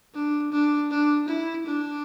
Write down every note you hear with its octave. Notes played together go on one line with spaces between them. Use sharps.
D4
D4
D4
E4
D4